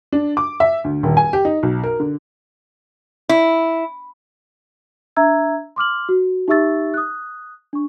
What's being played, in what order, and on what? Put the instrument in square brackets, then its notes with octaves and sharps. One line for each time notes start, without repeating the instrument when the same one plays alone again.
[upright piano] D4
D6
E5
D2
D#1
G#5
G4
D#4
B1
A#4
D3
[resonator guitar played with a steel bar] E4
[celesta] D4 E5 A#5 E6 G#6
C6 D6 F6 F#7
F#4
D#4 G4 E5 C#6 E6 A6
D#6 F#6
D4 C#6